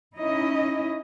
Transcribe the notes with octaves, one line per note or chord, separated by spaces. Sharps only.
C#4 D#4 E4 D#5